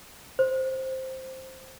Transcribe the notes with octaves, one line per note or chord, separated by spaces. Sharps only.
C5